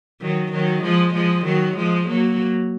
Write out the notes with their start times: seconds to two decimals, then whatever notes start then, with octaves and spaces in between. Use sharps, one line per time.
0.21 D#3 F#3
0.52 D#3 F#3
0.83 F3 G#3
1.14 F3 G#3
1.45 D#3 F#3
1.76 F3 G#3
2.08 F#3 A#3